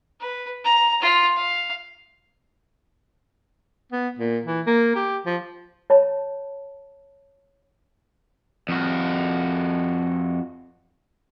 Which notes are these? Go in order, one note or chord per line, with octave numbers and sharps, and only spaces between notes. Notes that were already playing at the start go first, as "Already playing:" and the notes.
B4
A#5
F4
F5
B3
A#2
E3
A#3
G4
F3
C#5 A5 B5
F2 F#4